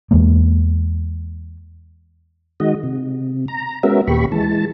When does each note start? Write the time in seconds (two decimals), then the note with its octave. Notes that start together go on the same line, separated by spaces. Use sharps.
0.11 E2 E3 G#3 A#3
2.60 D#3 G#3 F#4 D#5
2.83 C3
3.48 A#5
3.83 G#3 B3 C#4 F#4 A#4 E5
4.07 D#2 A#2 G4 B5 C#6
4.32 E3 G#3 A5